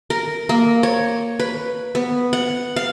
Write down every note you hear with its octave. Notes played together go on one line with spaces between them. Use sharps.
A#4
A#3
C#5
B4
B3
F#5
F5